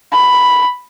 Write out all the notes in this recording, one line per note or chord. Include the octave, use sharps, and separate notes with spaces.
B5